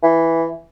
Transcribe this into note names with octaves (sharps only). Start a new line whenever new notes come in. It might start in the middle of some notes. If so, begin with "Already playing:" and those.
E3